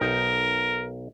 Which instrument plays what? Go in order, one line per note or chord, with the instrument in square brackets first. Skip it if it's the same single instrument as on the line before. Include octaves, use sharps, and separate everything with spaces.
[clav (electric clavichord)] B1 D#4 G5 [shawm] A#4